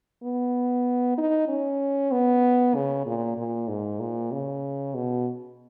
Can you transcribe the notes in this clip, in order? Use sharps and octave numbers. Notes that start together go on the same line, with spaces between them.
B3
D#4
C#4
B3
C#3
A#2
A#2
G#2
A#2
C#3
B2